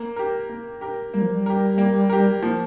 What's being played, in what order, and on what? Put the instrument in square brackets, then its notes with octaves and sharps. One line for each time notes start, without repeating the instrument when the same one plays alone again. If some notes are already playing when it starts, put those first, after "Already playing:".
Already playing: [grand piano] A#3
G4 A#4
A#3
G4 A#4
[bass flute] G3 [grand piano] A#3
[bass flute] F3
G3
[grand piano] G4 A#4
A#3
G4 A#4
[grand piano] F3 [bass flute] A#3